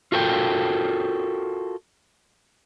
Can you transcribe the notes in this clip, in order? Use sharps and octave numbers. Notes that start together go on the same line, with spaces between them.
F4 F#4 A4 A#4 G5